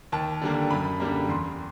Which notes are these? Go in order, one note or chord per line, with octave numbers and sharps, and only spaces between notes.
D#2 A5
D3 G3 A#3
F#2 B5
D3 G3 A#3
E2 C6